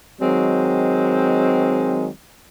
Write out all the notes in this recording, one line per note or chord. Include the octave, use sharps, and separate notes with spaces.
D#3 F#3 G#3 C4